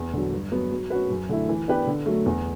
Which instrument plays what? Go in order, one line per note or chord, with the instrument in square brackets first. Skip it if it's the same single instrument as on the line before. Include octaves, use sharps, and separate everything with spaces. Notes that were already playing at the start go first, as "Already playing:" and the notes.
Already playing: [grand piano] E2
D3 F#3
G2
F#3 B3
F#3
C#4 F#4 B4
F#2
D3 A3 E4
E3
B3 D4 G4 B4
D3
F#3 A3
E2